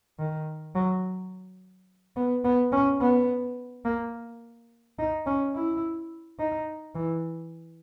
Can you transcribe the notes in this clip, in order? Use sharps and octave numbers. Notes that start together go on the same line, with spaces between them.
D#3
F#3
B3
B3
C#4
B3
A#3
D#4
C#4
E4
D#4
E3